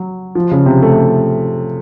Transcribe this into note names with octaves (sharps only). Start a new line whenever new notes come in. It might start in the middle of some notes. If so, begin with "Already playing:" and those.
Already playing: F#3
F3
C#3
C3
A3